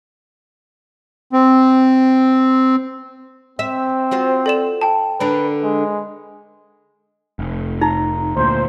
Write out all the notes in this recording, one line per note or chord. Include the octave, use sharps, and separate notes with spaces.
C4
C4 E5
F4 F#4 C5
A4 D5 E7
G5 A5
D3 D4 A#4 B4
G#3
F1
D#4 A#5
D2 A#2 C5